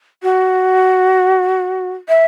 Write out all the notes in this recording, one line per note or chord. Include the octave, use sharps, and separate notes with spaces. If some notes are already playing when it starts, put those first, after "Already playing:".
F#4
E5